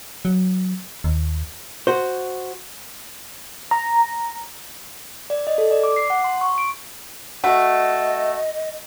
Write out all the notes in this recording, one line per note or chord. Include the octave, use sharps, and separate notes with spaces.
F#3
D#2
F#4 C5
A#5
D5
D#5
A4
D5
D6
C7
F#5
C6
C#6
D7
A3 F#4 D#5